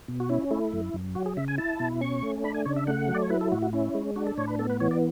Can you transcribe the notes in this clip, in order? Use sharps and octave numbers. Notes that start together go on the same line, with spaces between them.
B2
F#4
C#4 E4
A3 E4
F#2
F#2
F#3 F#4
G#4
C#3 E5
G#5
E4 A5
B2
C#4 C#6
A3
D4 B5
G#5
C#3 C#5
E5
A3 F#5
F#3
D5
C#5
E4 B4
A4
A2 F#4
F#4
C#4 E4
G#3
D4 F#4
A4
A2 C#5
B4
B3 A4
B4
E3 C#5
D5